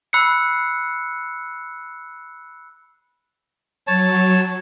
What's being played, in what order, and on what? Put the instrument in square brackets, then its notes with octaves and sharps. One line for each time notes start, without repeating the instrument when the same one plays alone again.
[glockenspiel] B5 E6 F#6 C7 C#7
[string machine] F#3 [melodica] C#5 A5